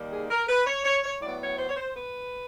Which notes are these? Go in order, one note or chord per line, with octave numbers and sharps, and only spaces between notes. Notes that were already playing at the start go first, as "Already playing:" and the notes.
Already playing: D#2 D#3 G3 A#3
G#4
A#4
B4
C#5
C#5
C#5
A2 F#3 B3 D5
C#5
C5
C#5
C5
B4